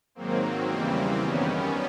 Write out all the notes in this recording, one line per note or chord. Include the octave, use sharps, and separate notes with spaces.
G#2 D#3 F#3 A#3 C4
E2 C#3 E3 G3 A#3 C4
F#2 D#3 G3 B3 C#4